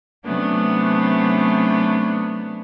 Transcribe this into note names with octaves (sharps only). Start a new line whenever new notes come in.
C3 F#3 A3 B3 C#4 D4